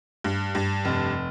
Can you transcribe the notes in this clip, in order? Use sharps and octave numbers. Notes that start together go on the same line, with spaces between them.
G2
G2
F1